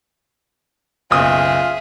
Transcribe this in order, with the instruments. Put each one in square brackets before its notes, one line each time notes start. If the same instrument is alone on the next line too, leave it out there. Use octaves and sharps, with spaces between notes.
[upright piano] F#1 B1 D#6 [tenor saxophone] F4 [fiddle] G#4 E5